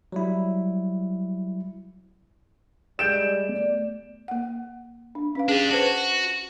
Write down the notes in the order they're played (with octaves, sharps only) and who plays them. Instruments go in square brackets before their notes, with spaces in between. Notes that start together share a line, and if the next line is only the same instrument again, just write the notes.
[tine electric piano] F#3 G3 E4
[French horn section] G3 G#3 D5 [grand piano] G6 D7 E7
[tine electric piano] A3 B3 [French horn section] D5
[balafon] A#3 F#5
D4
C#4 B4 F5
[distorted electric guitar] D4 G4 [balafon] G#4
[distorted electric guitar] F#4 [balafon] B4 C5 A5